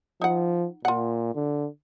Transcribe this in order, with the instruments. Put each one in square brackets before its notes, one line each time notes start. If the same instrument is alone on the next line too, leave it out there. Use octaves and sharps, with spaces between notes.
[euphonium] F3 [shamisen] D#4 F#5
[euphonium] A#2 [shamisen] F4 F#5
[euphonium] D3